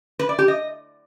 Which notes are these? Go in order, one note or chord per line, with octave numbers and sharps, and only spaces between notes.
B4
D5
G4
D#5